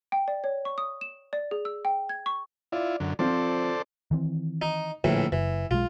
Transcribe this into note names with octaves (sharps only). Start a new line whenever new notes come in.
G5
D5
C#5
C#6
D#6
E7
D5
G#4
E6
G5
G#6
C#6
E4 F4 D5
F#2 D3
F3 C4 F4 A4 C5 D5
D#3 E3 C4
D#4
A#1 A2 D3 E3 F3
F#1 E3
B1 G#3 F4